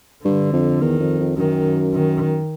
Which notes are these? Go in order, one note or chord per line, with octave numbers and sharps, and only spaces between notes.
G2 D3
F2
E2 D#3
F2
F2
F#2 D#3
D#3